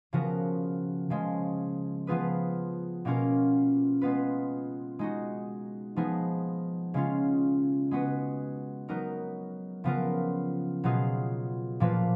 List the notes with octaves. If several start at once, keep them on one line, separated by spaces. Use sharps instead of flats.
C#3 F3 B3 F#4 A#4
C#3 F3 G#3
F3 B3 F4 G#4 B4
B2 A#3 C#4 F4 A#4
G#3 B3 F4 B4
G#3 D#4 F#4
F3 B3 D#4 G#4
C#3 G#3 C#4 F4
G#3 B3 F#4 B4
F#3 B3 D#4 A#4
C#3 F3 B3 F4 A#4
B2 F#3 B3 F4 G#4
A#2 F3 A#3 F4 B4